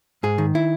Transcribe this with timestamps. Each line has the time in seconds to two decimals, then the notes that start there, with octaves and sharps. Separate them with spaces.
0.23 G#2 G#4
0.38 D#3
0.55 E4